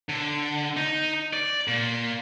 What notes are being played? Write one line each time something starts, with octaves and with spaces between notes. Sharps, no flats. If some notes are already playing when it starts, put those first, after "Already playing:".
D3
D#4
D5
A#2